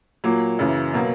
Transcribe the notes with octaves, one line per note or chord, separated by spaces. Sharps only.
A#2 F#3 A#3
F#2 C#3 E3
B2 F#3 A#3